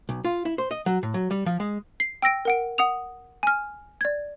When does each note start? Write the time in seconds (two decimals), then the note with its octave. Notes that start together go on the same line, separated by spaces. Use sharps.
0.09 B1
0.25 F4
0.45 E4
0.58 C5
0.71 D#5
0.86 F#3
1.03 A2
1.14 F#3
1.31 G3
1.46 F3
1.60 G#3
2.00 C7
2.22 G5 E6 A#6 D7
2.45 A#4 F#5 D7
2.78 F#5 D#6 F7
3.43 G#5 F6
4.01 D5 G#6